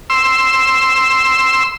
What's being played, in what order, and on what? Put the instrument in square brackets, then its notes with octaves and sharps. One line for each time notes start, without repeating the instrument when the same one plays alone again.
[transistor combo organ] C6 E6